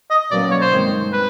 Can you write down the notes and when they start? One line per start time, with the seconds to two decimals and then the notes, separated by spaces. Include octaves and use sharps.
0.10 D#5
0.31 B2 F#3 A#3 C#4 D5
0.51 C#5
0.61 C5
0.71 G2 D#3 G#3 C4
1.13 B4